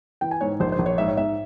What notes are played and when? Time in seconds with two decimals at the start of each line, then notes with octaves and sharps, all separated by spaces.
0.21 E3 G5
0.31 G#5
0.41 G#2 C#5
0.60 A#1 C5
0.72 C5
0.79 A#1
0.86 C#5
0.98 G#2 E5
1.08 C#5
1.17 G#2 E5